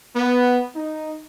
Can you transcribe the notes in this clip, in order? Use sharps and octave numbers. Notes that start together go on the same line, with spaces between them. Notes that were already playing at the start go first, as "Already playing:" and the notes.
B3
D#4